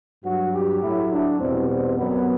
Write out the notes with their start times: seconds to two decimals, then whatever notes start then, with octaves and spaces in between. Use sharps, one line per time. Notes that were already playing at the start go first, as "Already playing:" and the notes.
0.24 G2 F#3 F#4
0.54 G4
0.82 A2 F#3 E4
1.11 D4
1.39 E2 B2 G3 C4
1.68 C4
1.97 F#2 F#3 B3